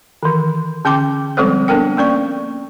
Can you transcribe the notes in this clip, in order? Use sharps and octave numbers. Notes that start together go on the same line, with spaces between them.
D#3 E3
D3 C#4 G5 C6 D6
F3 G3 G#3 C4 A4 C5
B3 D4 A4 A#4 G5
A#3 C#4 D5 C#6